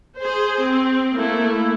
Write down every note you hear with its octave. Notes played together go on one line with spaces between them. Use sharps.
G#4 C5
C4
A3 A#3 E4